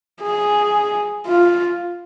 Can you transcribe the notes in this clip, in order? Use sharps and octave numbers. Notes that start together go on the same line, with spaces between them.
G#4
F4